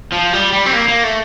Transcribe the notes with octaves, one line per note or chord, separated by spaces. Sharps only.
F3
G3
G3
C4
A#3
A#3
A3